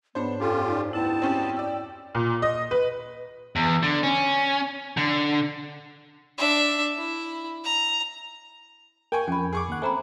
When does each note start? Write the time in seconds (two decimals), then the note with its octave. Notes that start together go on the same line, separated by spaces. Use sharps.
0.15 G#2 B3 D4 C5 C#5 B5
0.40 F#2 C#4 F4 G4 A4 G5
0.68 D#4 D5
0.93 D2 B3 E4 G5 A5
1.22 C4 C#4 G4
1.57 D5 E6
2.15 A#2
2.42 D#5
2.71 B4
3.56 E2
3.83 D3
4.03 C#4
4.97 D3
6.38 D4 E5
6.98 E4
7.64 A#5
9.12 A#3 G5 G#5 C#6
9.28 F2 C#4 B5
9.53 G#4 C#6 D6
9.69 D#2 F#5
9.82 A3 C4 G#5 A#5 B5